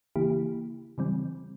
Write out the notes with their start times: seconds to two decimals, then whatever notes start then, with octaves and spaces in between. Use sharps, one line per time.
0.16 C#3 E3 A#3 E4 G4
0.98 C#3 E3 G3 C4